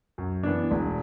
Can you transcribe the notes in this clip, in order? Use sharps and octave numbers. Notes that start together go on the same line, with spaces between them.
F#2
E3 B3 D4
E1